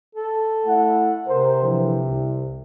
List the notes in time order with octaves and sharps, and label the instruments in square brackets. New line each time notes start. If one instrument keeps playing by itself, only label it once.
[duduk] A4
[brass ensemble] A3 E4 F#5
[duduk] C3 [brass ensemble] A#4 C5
[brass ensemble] D3 E3 F3
C2